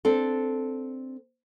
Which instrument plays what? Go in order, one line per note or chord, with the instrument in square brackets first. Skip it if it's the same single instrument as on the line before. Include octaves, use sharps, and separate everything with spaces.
[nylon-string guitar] C4 D4 A4